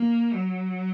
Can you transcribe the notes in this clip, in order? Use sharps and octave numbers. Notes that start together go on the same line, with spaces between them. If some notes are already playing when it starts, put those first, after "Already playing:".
Already playing: A#3
F#3